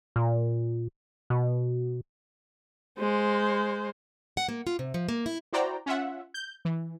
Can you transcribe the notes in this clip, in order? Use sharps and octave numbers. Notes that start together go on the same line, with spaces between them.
A#2
B2
G#3 C5
F#5
A#3
F4
C3
F3
A#3
E4
E4 F#4 C5 D5 G5 A#5
C#4 F4 E5 F#5
G6
E3